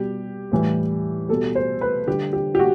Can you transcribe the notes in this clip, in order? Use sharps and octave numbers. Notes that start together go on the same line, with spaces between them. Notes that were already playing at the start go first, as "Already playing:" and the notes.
Already playing: B2 G3 G4
A2 E3 G3
B2 G3 A4
C5
B4
D3 G3 G4
G4
G4
F#4